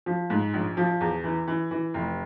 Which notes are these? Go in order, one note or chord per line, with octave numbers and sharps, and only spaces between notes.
F3
G#2
A#1
F3
E2
E3
E3
E3
F1